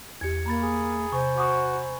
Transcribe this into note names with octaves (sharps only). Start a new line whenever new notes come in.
E2 G4 G#6 C#7
A#3 A#5 B5 A6
G#4
C3 C5 G#5 C#6
F#4 D6 D#6